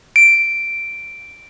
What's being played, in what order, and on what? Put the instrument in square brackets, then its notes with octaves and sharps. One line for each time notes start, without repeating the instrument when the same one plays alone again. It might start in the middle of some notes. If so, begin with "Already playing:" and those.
[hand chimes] D7